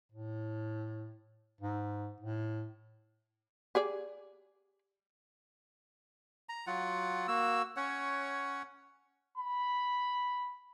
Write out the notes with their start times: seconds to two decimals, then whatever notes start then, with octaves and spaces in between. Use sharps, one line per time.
0.12 A2
1.61 G#2
2.20 A2
3.75 G4 G#4 D5
6.49 A#5
6.67 F#3 F4 F#5
7.28 A#3 F#4 E6
7.77 C#4 C#5 F#5
9.38 B5